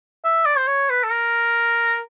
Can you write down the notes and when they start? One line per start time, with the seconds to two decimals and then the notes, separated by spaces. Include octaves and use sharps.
0.25 E5
0.46 D5
0.58 C5
0.67 C#5
0.90 B4
1.04 A4
1.12 A#4